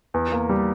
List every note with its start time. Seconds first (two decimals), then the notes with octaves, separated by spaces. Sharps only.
0.14 E2
0.32 A#3
0.49 G3